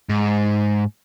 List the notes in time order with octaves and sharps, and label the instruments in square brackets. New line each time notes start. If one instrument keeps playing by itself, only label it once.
[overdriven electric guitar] G#2